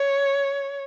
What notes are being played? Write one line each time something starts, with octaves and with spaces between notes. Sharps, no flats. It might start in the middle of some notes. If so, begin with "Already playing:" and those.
Already playing: C#5